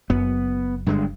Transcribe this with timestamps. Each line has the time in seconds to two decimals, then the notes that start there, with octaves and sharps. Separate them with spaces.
0.10 F#1 F#2 B3
0.86 G2 D3 G#3